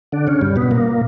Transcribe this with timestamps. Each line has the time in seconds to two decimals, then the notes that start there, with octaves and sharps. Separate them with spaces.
0.12 D3 D4
0.27 C#3 C#4
0.41 G2 G3
0.56 B2 B3
0.71 A#2 A#3